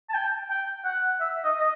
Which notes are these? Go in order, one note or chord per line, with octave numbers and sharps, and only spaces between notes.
A5
G5
G5
F#5
E5
D#5
D#5